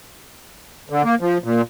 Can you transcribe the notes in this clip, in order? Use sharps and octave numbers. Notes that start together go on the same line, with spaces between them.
D3
A#3
F3
A#2